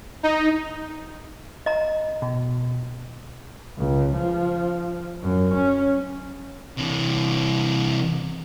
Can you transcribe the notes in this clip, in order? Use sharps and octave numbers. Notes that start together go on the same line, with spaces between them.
D#4
D#5 A#5
B2
C#2
F3
F#2
C#4
C3 E3